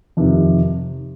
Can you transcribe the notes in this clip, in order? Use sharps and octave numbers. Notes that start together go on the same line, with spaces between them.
F2 C3 D#3